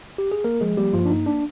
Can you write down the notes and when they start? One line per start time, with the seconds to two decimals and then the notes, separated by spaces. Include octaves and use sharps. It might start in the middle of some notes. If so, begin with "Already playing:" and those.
0.18 G4
0.32 G#4
0.44 A#3 A#4
0.61 F3 G#3 G#4
0.77 G3 A#3 G4
0.93 G2 F3 F4
1.05 D4
1.10 A#3 D#4
1.26 D4